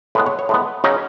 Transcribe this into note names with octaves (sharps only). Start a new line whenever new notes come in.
A2 G#3 B3 B4
C#5
C#5
A2 G#3 B3 B4
C#3 F#3 C#4 D#4